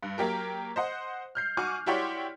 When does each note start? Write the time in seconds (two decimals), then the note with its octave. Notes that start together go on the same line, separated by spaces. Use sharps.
0.03 G2
0.18 F#3 A#3 G4 A#4
0.76 C5 D#5 F#5
1.35 F6 G6 C7
1.57 F#4 G#5 C#6 D6 F6
1.86 E4 F#4 G4 C#5 D5 C6